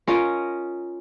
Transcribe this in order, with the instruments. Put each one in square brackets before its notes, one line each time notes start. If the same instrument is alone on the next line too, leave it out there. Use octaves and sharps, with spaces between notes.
[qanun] C#4 F4 A#4 D#5